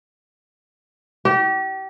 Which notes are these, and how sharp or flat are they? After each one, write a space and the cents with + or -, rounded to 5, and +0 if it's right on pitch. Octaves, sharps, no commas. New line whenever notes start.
G4 -30